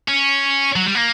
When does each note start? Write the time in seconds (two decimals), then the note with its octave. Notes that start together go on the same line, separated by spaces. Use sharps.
0.08 C#4
0.76 F#3
0.86 G3
0.95 A#3